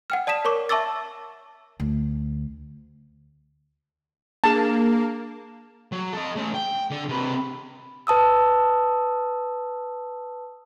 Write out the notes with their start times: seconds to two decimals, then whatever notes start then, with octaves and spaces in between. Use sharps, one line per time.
0.10 F#5 G5 F6
0.27 D5 A5 D#6 B6 E7
0.45 A#4 C#5 C#6 D6
0.69 E5 A5 C#6 D6 E6 A6
1.80 D2
4.44 A#3 D4 G#4 A5
5.92 F#3
6.12 A4 D#5
6.36 A3 C#4
6.54 G5
6.91 D3
7.09 C3 B4
8.07 B4 A5 D#6 E6